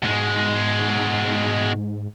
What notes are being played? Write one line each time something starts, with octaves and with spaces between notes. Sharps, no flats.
G#2 B2 G#3